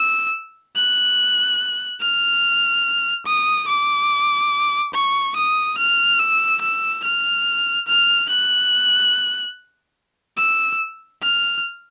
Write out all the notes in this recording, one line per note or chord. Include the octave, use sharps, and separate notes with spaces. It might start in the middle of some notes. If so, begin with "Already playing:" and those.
Already playing: E6
F#6
F6
D#6
D6
C#6
D#6
F6
E6
E6
F6
F6
F#6
E6
F6